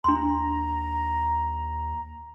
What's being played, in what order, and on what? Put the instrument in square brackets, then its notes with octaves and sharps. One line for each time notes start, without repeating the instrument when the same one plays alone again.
[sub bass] D#2 [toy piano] D4 C6 [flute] A#5